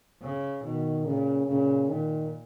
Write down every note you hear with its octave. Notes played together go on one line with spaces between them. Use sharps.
C#3
B2 D#3
A#2 C#3
A#2 C#3
A#2 D#3